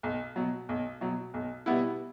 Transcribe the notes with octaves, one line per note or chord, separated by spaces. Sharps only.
B1
B2 F#3
B1
B2 F#3
B1
B2 G3 B3 E4